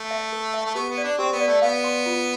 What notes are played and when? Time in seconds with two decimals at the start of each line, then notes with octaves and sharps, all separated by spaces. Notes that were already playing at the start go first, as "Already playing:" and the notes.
Already playing: A3
0.11 E5
0.32 A4
0.54 E5
0.66 A3
0.75 B3 G4
0.90 B3
0.98 D5
1.04 D4
1.18 C4 G4
1.33 B3
1.40 D5
1.47 A3
1.62 B3 F5
1.84 C6
2.06 F4